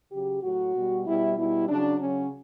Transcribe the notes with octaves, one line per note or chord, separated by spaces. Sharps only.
C#3 F#3 G4
A2 F#3 F#4
B2 G3
B2 G3 E4
B2 G3 E4
C#3 F#3 D4
C#3 F#3 C#4